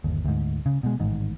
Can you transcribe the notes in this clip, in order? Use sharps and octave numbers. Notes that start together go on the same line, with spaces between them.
G1 D#2
D2 G#2
C#3
B2 G#3
A1 G#2 D#3